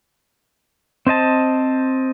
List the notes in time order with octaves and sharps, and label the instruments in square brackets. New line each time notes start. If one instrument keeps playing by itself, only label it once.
[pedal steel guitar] C4 C5 D#5 A5